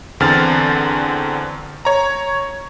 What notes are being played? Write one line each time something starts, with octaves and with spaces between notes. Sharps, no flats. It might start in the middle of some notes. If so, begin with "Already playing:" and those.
E2 D3 C4 F6 A6
C#5 A#5